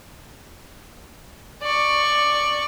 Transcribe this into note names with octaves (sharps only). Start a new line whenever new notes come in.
D5 C#6